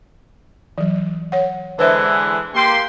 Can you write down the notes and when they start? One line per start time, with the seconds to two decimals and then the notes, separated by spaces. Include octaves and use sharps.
0.78 E3 F#3
1.32 C#5 F#5
1.79 D3 E3 G#3 B4 C5 E5
2.54 A#3 G4 C6